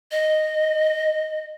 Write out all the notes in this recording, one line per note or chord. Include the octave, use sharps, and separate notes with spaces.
D#5